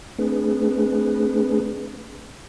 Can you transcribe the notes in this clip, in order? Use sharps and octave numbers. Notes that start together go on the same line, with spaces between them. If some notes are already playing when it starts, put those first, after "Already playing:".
A3 C4 D4 G#4 B4